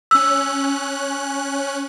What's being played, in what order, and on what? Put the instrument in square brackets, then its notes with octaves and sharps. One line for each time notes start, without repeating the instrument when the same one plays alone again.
[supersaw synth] C#4 F#6 [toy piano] E6